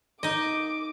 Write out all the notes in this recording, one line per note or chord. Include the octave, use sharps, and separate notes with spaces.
D#4 D#5 D6